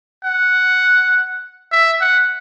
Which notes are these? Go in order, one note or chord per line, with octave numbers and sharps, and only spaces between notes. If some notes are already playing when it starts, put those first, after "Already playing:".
F#5
E5
F#5